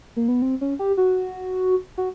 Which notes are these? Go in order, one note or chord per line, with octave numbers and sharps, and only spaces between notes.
A#3
B3
C4
C#4
G4
F#4
F#4